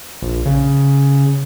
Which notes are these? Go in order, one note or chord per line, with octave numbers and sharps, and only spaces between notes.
A#1
C#3